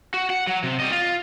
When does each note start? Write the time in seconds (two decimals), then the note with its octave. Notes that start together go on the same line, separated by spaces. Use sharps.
0.14 F#4
0.30 F#5
0.47 F#3
0.63 C3
0.80 G3 D#5
0.92 F4